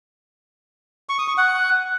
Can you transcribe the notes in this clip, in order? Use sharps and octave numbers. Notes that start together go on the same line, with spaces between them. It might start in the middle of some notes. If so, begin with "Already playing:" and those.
C#6
D#6
C#6
F#5